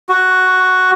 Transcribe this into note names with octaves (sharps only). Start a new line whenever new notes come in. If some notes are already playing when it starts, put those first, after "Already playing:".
F#4